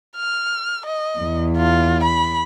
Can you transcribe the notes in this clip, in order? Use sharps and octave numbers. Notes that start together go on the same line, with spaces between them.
F6
D#5
E2
F4
B5